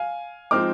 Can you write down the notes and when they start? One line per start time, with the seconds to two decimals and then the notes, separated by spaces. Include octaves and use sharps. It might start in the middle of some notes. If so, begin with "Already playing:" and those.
Already playing: F5 G#5
0.51 F3 G#3 C4 D#4 D6 F6